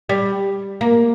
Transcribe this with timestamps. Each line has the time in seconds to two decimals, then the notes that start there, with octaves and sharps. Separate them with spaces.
0.09 G3
0.81 A#3